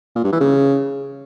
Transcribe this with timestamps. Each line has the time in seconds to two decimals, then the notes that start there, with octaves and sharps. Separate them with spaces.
0.16 A#2
0.24 G2
0.32 E3
0.40 C#3